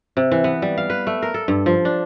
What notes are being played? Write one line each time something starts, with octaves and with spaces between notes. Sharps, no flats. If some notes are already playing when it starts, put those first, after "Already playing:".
C3
E3
B3
G3
F5
B4
A3
A#4
A4
G2
F3
D4